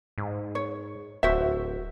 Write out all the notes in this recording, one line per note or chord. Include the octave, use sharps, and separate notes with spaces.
G#2
C#5
D1 F#4 C5 E5